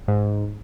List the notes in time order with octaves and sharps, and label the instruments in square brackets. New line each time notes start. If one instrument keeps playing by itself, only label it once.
[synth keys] G#2